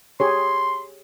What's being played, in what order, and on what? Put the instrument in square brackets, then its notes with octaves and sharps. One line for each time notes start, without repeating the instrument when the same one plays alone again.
[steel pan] G4 G#4 C#5 [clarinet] C6